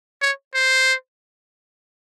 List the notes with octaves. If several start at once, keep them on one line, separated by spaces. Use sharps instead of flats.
C#5
C5